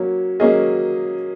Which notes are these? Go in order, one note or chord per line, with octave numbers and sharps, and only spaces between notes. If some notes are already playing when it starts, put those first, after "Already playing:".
Already playing: F#3 A#3 C#4
F#3 A#3 C#4 G#4 D#5